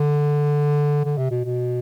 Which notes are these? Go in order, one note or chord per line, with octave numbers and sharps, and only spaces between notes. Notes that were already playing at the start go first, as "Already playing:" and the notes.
Already playing: D3
D3
C3
B2
B2